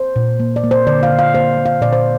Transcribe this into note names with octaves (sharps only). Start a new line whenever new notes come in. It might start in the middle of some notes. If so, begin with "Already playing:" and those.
Already playing: C5
A#2
A#3
D5
A#3
C5
D3 D5
F5
D3
F5
A#3 C5
A#3
F5
A#2 D5
C5